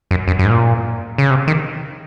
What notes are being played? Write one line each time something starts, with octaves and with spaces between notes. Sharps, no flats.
F#2
F#2
F#2
G#2
A#2
C#3
C3
D#3